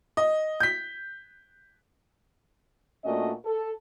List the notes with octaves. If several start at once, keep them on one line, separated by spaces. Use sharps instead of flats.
D#5
G6 B6
A#2 A3 C#4 D4 F#4 D#5
A4